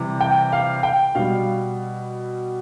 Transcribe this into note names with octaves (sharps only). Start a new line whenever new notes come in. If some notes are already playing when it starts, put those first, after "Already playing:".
Already playing: C3 E3 G3
G5
F5
G5
B2 G3 F5